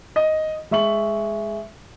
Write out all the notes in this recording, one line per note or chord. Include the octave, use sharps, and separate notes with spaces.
D#5
G#3 E5 C#6 F#7